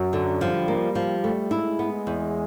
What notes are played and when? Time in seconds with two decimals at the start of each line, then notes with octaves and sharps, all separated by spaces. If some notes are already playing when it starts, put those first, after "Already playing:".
Already playing: F#2 F#3
0.13 D3
0.41 F3 G3
0.68 A#3
0.95 F3
1.24 A3
1.51 G#3 E4
1.79 B3
2.07 E2